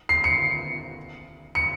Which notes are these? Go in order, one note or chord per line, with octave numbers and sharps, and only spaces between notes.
C7
C#7
C#7